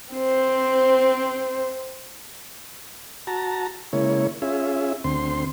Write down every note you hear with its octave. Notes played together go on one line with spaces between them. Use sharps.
C4 C5
F#4 A5 A#5
C#3 G#3 A#3 E4 C#5
C#4 F4 G#4 E5
D2 C4 C6